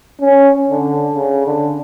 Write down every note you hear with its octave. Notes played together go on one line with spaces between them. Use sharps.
C#4
D3
C#3
D3